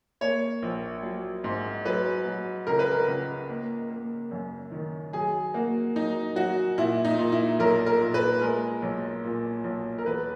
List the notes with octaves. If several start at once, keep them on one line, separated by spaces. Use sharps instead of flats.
A#3 C#5
A#1
F#3
G#2
F#3 B4
F#3
C#2 A#4
B4
A#4
C#2
A#3
A#3
F#2
D#3
F#3 G#4
A#3 F#4
F#3 D#4
F#3 F#4
A#2 E4
D#4
A#2
E4
B1 A#4
A#4
A#2
B4
G#3 A#4
B1
A#2
B1
A#4
E2 B4